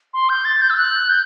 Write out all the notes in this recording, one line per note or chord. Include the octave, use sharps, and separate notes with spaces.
C6
G6
A6
G6
E6
F#6
G6